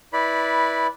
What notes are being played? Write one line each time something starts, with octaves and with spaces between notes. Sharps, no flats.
E4 B4 D5 B5